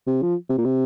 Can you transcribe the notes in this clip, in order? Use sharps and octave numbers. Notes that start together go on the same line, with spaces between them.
C3
F3
C3
A#2
C3